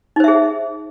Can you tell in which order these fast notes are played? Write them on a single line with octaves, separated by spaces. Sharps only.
D#4 C5 E5 G#4